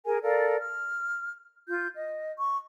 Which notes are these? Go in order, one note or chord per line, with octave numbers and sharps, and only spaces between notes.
G#4 A#4 G#5
A4 A#4 D5 F5
F6
F4 G6
D#5
C#6